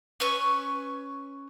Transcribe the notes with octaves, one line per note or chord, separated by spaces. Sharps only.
C#4 B4 C#6 E6